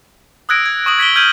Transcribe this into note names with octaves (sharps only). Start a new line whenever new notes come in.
D#6 E6 F#6 G#6 A#6 D7
G#6
C#6 D#6 F#7
G#6 B6 D7 G7
F6 G6 G#6 D#7 F#7